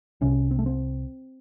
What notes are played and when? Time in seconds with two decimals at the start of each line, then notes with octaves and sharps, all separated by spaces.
0.21 C2 C3 C#4
0.51 C4
0.59 A3
0.66 C4